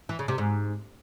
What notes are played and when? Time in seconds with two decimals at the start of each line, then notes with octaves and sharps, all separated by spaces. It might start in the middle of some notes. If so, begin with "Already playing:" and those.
0.09 E3
0.19 C#3
0.28 C3
0.38 G#2